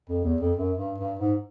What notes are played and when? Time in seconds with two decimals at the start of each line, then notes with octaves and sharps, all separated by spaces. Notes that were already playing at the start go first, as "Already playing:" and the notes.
0.09 F2
0.24 E2
0.41 F2
0.57 F#2
0.77 G2
0.98 G2
1.19 G#2